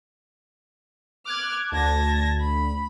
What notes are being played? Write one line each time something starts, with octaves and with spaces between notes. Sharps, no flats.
D6 F6 F#6 G#6
D2 A5 G#6 A#6
B5